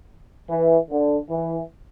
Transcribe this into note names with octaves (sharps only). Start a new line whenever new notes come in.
E3
D3
E3